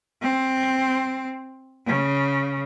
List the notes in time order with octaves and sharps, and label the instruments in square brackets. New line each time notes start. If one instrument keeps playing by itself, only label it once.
[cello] C4
C#3